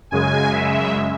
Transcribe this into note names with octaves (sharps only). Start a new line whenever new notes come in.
F#2 C#3 G#3 G#5
E5